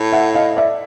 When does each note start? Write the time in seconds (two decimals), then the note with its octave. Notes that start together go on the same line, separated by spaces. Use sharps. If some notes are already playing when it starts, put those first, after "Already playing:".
Already playing: A2
0.12 E5 F#5
0.34 D#5 F5
0.57 D5 E5